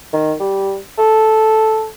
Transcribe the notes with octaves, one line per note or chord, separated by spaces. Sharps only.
D#3
G3
A4